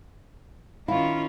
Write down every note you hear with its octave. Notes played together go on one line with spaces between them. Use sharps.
D#3 C#4 E4 F4 F5